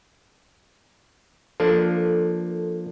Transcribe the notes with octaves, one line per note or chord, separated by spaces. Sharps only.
F3 A#3 D4 A4